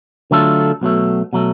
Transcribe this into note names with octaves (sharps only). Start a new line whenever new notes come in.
D3 F#3 A3 F4 A4
B1 B2 F#3 A3
B2 F#3 A3